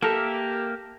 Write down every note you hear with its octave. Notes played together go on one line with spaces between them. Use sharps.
A#3 G4 A4 A#4 E5